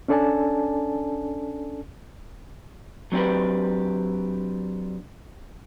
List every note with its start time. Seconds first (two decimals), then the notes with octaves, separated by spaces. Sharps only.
0.08 C#4 D4 A4 D5 G#5 A5
3.12 F#3 C4 D4 G4 B4